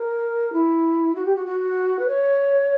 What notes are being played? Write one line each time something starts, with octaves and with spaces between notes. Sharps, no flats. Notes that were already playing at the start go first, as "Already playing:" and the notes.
Already playing: A#4
E4
F#4
G4
F#4
F#4
B4
C#5